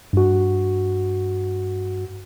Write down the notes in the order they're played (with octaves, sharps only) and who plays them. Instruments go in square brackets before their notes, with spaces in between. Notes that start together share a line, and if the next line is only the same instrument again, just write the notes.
[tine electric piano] G2 F#4